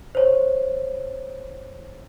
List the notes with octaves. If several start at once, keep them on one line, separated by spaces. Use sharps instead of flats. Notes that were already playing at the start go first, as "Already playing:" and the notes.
C5 C#5